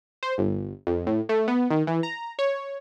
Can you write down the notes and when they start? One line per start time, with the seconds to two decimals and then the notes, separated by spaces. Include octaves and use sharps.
0.23 C5
0.38 G1
0.87 F2
1.07 A2
1.29 A3
1.48 B3
1.71 D#3
1.87 E3
2.03 A#5
2.39 C#5